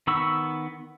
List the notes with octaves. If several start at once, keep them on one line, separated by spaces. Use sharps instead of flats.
D#3 B3 B5 C#6 E6